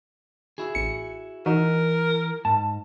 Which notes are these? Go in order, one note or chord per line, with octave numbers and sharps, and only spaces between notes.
E4 F#4 G#4
A1 C#7
E3 D#4 F#4 A#4
G#2 A5